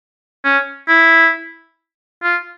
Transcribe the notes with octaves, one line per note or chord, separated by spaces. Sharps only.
C#4
E4
F4